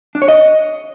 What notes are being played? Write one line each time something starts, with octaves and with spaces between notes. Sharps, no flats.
D4
C#5
D#5